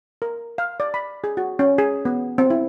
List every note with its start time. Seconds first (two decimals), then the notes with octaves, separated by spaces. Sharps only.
0.22 A#4
0.58 F5
0.80 D5
0.94 B5
1.24 G#4
1.37 F#4
1.59 C#4
1.78 G#4
2.05 B3
2.38 C4
2.50 E4